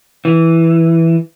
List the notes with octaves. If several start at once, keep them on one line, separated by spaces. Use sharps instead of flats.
E3